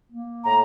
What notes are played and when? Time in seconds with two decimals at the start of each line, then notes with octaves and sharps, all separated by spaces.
0.10 A#3
0.45 A2 A#5